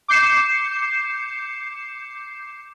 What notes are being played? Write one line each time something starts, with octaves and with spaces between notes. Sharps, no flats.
D6 G6 C7 C#7 E7